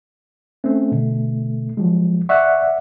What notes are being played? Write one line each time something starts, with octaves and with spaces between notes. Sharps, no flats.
A3 C4 C#4
B2 D3
F3 F#3 G#3
D5 E5 F#5 C#6 F#6